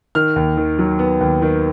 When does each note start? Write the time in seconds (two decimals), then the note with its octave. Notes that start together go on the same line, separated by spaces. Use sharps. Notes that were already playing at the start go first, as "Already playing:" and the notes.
0.15 D#3 F6
0.36 D#2
0.57 D#3
0.79 F#3
0.99 B3
1.21 D#2
1.42 D#3